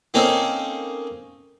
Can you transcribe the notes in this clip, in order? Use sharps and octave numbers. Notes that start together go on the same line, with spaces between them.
A#3 C4 C#4 D#4 A4 A#4